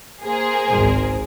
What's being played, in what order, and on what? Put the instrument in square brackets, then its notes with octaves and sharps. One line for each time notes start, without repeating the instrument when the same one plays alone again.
[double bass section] A#3 [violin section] G#4 A#4 C5
[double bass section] G#1 C#2